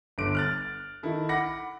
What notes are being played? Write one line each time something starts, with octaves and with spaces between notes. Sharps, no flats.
G1 D3 D6 D7
F6 F#6 A6
D#3 E4 A4
F#5 B5 D6 A#6 C#7